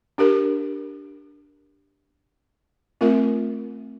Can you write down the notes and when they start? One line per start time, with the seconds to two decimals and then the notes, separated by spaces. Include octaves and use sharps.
0.18 D4 G4 A#4
3.01 A3 C4 F4 A#4 E5